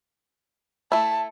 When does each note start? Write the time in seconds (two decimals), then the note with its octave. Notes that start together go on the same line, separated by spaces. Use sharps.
0.92 A3 E4 A5